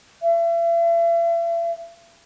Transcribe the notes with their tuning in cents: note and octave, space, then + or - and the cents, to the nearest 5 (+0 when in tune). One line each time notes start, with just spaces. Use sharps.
E5 +40